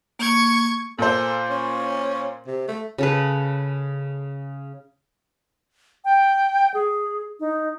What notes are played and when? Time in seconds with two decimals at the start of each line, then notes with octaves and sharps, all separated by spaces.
0.19 A#3 C#6 G#6
0.98 A#2 A4 C5
1.50 C#4
2.47 C3
2.68 A3
2.98 C#3 A4 B4
6.05 G5
6.74 G#4
7.40 D#4